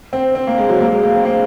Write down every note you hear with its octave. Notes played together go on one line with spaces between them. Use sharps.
C4
C4
A#3
G#3
F#3
A#3
G#3
A#3
C4
A#3